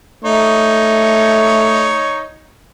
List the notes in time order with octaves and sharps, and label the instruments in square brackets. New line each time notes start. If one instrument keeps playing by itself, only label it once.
[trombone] A3 [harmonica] D#4 C#5